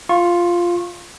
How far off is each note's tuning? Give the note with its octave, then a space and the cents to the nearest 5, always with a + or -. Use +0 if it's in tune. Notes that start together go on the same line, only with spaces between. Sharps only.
F4 +0 C#6 -30